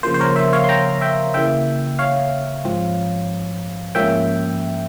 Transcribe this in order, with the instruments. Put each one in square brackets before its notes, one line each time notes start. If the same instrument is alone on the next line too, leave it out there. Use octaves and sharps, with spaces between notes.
[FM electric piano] C#3 F3 A#3 C5
C5
A#4 C#5
C5 E5
C#5 F5
C6
G5 A#5
E5 G5
C#3 E3 A#3 E5 G5
C#5 F5
G#2 F3 C4
G#2 F3 A#3 C#4 E5 G5